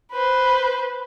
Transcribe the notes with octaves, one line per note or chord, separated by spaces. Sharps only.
B4 C5